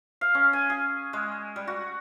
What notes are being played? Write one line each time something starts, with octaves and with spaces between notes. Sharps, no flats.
F5
C#4
G#5
G#4
G#3
G3
F#4